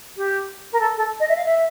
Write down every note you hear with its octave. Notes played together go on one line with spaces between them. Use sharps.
G4
A#4
A4
A4
D#5
E5
F5
E5